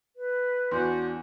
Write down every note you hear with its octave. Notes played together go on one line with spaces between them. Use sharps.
B4
E2 C#4 D4 F#4 C6 G6